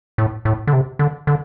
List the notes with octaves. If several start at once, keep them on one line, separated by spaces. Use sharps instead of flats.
A2
A2
D3
C3
D3
D3